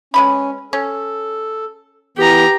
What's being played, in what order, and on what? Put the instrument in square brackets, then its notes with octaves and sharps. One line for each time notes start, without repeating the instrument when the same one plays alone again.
[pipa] G#3 B4 B5 [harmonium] C#4
[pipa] C#4 [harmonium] A4
[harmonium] E3 B3 [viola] G4 A#5